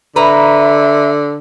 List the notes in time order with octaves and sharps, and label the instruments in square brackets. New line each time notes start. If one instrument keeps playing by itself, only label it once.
[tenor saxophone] D3 [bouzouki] B4 A#5 [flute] E5